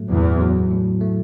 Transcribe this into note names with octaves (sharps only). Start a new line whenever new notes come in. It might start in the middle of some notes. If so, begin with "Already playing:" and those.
Already playing: A2 F#3 A3
E2 A2
F#3
A2
A3